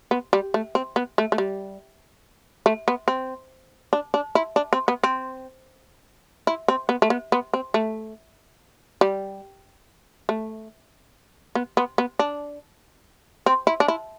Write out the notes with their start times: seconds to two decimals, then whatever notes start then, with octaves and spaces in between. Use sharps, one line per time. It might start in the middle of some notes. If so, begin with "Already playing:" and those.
0.11 B3
0.33 G3
0.54 A3
0.75 C4
0.96 B3
1.18 A3
1.32 A3
1.38 G3
2.66 A3
2.88 B3
3.08 C4
3.93 D4
4.14 D4
4.35 E4
4.56 D4
4.73 C4
4.88 B3
5.04 C4
6.47 E4
6.68 C4
6.89 B3
7.02 A3
7.10 B3
7.32 B3
7.54 C4
7.74 A3
9.01 G3
10.29 A3
11.55 B3
11.77 B3
11.98 B3
12.19 D4
13.46 C4
13.67 E4
13.80 D4
13.88 E4